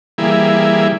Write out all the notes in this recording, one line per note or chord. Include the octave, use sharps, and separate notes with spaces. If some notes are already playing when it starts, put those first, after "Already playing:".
E3 G3 A#3 E4 G#4